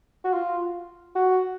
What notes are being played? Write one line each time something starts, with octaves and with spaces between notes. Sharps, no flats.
F#4
F4
F#4